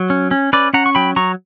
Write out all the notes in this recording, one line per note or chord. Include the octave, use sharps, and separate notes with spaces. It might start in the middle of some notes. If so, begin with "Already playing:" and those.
Already playing: F#3
C#4
C#4
C#4 B4 D5
C#4 F#5 A#5
C#6
F#3 G5 B5
F#3 A#5 C#6